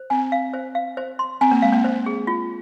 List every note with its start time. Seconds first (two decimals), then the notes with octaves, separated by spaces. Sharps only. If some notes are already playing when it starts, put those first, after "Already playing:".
Already playing: C5
0.10 C4 G#5
0.32 F5
0.54 C5
0.75 F5
0.97 C5
1.19 C6
1.41 C4 G#5
1.51 A#3
1.62 G#3 F5
1.73 A#3
1.84 C5
2.06 G#4
2.27 F4